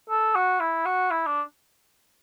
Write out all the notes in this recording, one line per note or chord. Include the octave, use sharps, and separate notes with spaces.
A4
F#4
E4
F#4
E4
D4